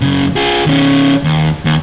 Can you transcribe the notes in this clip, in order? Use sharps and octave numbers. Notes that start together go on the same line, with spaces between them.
F#2 C#3
F4 G#4
D#3 C#4
D#2
D#2